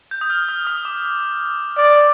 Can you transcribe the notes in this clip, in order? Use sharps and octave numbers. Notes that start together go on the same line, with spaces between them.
G6
D#6
F6
D#6
D#6
D6
D5